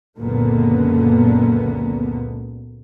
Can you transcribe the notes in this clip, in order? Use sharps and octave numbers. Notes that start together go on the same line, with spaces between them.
C#2 F#2 A#2 D3 A#3 B3